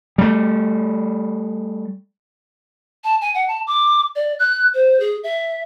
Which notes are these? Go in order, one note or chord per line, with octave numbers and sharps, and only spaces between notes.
G3 A3
A5
G#5
F#5
A5
D6
D5
F#6
C5
G#4
E5